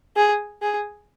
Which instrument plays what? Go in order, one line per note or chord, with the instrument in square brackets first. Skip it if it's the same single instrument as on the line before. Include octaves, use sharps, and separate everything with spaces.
[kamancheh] G#4
G#4